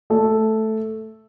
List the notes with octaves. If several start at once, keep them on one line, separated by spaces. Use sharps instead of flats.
A3 A4